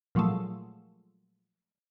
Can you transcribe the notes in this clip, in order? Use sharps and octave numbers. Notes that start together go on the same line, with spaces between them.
A#2 F3 F#3 G#3 A3